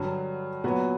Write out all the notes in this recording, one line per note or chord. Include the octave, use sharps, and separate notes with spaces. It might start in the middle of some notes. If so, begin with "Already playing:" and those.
Already playing: G2 D3 F#3
A#2 F#3 B3 F#4 B4